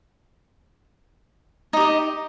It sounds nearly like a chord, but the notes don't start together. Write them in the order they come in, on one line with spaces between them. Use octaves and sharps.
D#4 G4 D#5